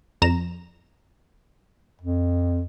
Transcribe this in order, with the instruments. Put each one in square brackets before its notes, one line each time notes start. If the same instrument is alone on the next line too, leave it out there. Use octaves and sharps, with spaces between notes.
[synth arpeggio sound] F2 A#5 E7
[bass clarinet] F2